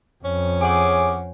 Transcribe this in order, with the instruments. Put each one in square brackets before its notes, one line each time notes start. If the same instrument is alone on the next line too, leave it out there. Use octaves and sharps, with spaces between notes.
[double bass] F2 [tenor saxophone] C#4
[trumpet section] G#4 D6 [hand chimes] C#5 F#5 G#5